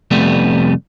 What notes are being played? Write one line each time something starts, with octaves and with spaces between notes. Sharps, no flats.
C2 F2 G3 A3 B3